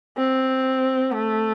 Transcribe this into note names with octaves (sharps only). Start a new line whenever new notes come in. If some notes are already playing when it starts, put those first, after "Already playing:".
C4
A3